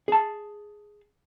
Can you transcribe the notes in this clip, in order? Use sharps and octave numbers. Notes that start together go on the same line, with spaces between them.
G#4 A5